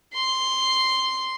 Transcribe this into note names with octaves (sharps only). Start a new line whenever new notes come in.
C6